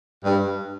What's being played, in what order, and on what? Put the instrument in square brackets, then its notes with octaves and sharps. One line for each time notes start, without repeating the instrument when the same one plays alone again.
[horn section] G2